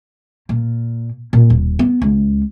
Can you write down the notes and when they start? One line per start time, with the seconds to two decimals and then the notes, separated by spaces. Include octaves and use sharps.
0.49 A#2
1.33 A#2
1.50 D#1
1.79 B3
2.02 C#2